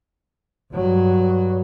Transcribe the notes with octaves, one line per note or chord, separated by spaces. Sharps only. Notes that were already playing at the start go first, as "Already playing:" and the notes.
G2 F#3